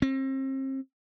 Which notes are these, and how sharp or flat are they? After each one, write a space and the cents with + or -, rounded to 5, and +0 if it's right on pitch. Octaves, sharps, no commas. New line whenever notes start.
C4 +35